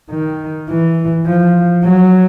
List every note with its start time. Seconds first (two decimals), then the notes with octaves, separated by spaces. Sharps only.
0.11 D#3
0.69 E3
1.27 F3
1.84 F#3